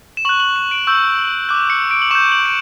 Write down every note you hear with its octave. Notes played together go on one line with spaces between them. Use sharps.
E7
C#6 F#6 F#7
F#7
E7
D7
C#6 E6 G6
D6 F#6
C#7
D7
F#7
C#6 G6 E7
F#7
D7